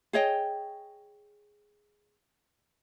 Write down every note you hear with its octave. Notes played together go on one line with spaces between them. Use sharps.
G#4 C#5 D#5 G5